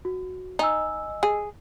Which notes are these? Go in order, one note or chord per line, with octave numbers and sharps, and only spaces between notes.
F#4
D#4 D#5 G#5 E6
G#4